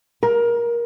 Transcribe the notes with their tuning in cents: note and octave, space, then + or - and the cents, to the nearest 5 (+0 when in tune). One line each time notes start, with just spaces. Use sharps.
A#4 +20